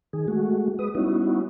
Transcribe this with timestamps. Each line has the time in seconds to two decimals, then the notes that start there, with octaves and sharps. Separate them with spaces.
0.13 D#3 G#4
0.28 G#3 A3 F#4
0.79 G#3 B4 D#6
0.95 G3 B3 C#4 D#4 E4 F#4